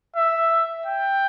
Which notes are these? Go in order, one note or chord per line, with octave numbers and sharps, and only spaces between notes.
E5
G5